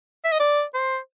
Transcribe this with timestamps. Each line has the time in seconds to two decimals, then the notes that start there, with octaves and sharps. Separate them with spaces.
0.25 E5
0.32 D#5
0.40 D5
0.74 C5